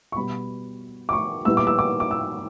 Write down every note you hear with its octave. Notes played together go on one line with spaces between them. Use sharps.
C#6
B2 G3 B3 B5
D6
C#6
A#2 G3 B3 E4 E6
D6
E6
D6
D6
E6